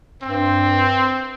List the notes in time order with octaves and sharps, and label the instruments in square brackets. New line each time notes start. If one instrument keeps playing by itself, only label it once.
[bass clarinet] G2 [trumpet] C4